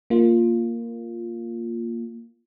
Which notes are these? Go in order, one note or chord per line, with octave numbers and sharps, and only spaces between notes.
A#3 F4